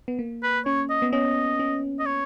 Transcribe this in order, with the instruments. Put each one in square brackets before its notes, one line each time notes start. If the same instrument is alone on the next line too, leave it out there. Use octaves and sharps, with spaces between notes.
[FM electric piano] B3
A#3
[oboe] B4
[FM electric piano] C#4 [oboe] C#5
[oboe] D#5
[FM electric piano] B3
[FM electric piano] C#4 [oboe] D#5
[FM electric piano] C#4
[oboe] D#5
C#5